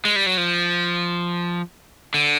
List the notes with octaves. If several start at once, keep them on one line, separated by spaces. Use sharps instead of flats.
G#3
G3
F#3
F3
D3